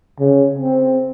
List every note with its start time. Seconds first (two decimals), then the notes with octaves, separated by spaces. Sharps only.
0.20 C#3
0.59 C4